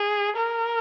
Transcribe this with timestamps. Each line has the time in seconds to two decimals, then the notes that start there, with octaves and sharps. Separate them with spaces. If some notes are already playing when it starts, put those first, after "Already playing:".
Already playing: G#4
0.36 A#4